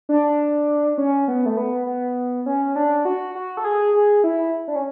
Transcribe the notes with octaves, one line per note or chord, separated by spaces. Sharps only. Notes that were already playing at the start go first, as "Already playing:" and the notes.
D4
C#4
B3
A3
B3
B3
C#4
D4
F#4
F#4
A4
G#4
G#4
E4
D4
C#4